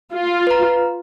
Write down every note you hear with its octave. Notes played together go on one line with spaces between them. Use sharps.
F4
B4 A#5